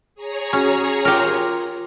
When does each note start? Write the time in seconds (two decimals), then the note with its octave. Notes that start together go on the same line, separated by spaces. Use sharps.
0.15 G#4 C#5 A#5
0.53 C#4 F#4
1.05 F4 G4 A#4